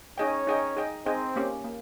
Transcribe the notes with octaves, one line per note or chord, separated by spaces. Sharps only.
C#4 D#4 G#4 C#5 D#5 G5
D#4 G#4 D#5 G5
D#4 G#4 D#5 G5
C4 D#4 G#4 C5 D#5 G5
A#3 C#4 G4
A#3